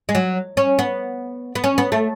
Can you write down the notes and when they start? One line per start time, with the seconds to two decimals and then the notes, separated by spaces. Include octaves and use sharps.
0.09 G#3
0.15 F#3
0.57 C#4
0.79 B3
1.55 B3
1.64 C#4
1.78 B3
1.92 A3